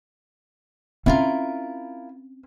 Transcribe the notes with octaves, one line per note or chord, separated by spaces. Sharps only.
C4 C#4 E4 F4 A#4